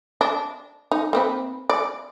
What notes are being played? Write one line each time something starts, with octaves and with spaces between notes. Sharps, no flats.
D4
D#4
A#3 C4 B4
D5